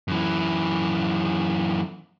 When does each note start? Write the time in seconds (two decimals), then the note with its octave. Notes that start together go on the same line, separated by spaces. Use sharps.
0.08 F#2 E3